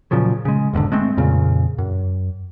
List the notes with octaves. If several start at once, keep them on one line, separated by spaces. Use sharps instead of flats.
A#2 C#3 F3 F#3
C#3 G#3
E1 D2 G#2 D3
G#3 A3 C4
F2 A#2 C#3
F#2